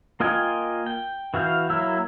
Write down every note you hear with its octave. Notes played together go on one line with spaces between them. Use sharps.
A#3 F4 D#5 G5 G#5
G5
E3 F#4 F5 G6
F#3 A#3 E4 E6